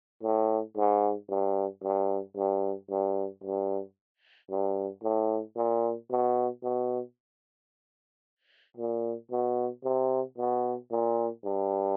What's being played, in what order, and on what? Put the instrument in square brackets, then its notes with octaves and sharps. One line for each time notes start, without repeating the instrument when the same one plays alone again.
[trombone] A2
G#2
G2
G2
G2
G2
G2
G2
A2
A#2
B2
B2
A#2
B2
C3
B2
A#2
G2